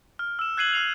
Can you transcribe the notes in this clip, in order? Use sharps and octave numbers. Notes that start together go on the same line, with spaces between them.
F6
E6 E7
F#6 G#6 C7 D#7 F#7
F6 C7 F7